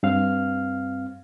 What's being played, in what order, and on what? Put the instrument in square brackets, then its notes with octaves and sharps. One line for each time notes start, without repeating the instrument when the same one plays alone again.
[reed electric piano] G2 C4 F5 F6